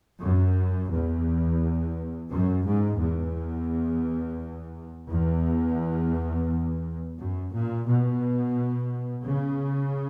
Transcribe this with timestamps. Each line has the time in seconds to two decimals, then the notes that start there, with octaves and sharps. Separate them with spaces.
0.23 F#2
0.92 E2
2.31 F#2
2.65 G#2
3.01 E2
5.09 E2
7.18 F#2
7.53 A#2
7.87 B2
9.26 C#3